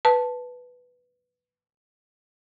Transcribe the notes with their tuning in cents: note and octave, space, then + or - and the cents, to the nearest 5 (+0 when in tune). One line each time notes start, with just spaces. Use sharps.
B4 +0 A5 +0